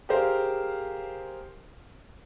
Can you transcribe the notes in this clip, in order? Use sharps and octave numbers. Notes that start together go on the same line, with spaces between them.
G4 G#4 A#4 C5 F5